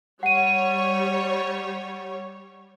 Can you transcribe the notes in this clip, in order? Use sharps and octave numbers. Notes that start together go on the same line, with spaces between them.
G3 C#5 F#5 D#7